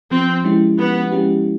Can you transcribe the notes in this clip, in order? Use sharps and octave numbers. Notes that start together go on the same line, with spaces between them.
F3 C4
G#3 C#4 E4 G4
F3 B3
G#3 C#4 E4 G4